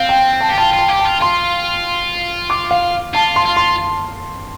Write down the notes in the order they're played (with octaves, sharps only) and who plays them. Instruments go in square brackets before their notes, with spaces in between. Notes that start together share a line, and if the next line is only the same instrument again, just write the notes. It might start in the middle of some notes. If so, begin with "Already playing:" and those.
Already playing: [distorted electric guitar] C4 [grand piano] F5
[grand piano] G5
A5
[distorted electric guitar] G4
[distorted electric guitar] F4 [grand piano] A5
[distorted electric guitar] F4
[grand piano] A5
[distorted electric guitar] G4
[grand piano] A5
[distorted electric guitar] F4
[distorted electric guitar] F4 [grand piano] C6
[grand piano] D6
F5
[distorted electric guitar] F4 [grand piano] A5
[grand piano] C6
[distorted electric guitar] F4
[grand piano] C6